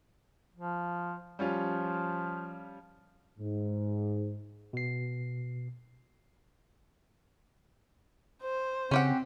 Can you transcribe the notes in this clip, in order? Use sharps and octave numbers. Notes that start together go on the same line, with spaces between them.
F3
F3 G3 C#4 F4
G#2
B2 C7
C5
C#3 C4 C#4 G4 F#5